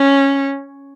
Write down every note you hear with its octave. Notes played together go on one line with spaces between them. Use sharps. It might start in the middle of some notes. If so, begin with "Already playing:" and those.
Already playing: C#4